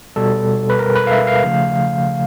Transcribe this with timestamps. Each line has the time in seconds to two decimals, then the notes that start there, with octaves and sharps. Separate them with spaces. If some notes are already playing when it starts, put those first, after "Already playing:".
0.16 B2 G3 A4
0.70 B4
0.79 A#4
0.95 B4
1.07 F5
1.11 E5
1.27 F5
1.43 C#3 F3 A3